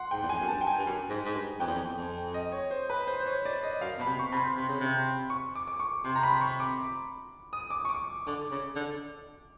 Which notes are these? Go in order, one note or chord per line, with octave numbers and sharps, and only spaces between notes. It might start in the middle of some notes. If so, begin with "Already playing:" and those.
Already playing: F#5 C6
G#2 G5
E2
F2 G#5
F#2
G2 A5
G5
G#5
G2
F#2
G#2
G#2
G2
F2 G5
E2
F2
F2
D#5
C#5
C5
B4
C5
C5
C#5
D5
D#5
F#2 F5
B2 B5
C3
C#6
C3 B5
C6
C3
C#3
C3
C#6
D6
D6
C#6
C3 C6
A#5
B5
C#6
D6
D#6
D6
C#6
D6
D3 D6
C#3
D3